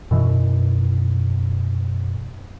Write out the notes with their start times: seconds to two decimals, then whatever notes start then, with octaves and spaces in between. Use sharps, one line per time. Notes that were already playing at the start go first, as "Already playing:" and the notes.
0.11 F#2 B2 E3